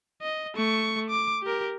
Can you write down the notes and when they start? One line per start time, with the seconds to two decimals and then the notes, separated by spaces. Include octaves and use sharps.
0.22 D#5
0.55 A3 C#6
1.10 D6
1.43 G4 A#4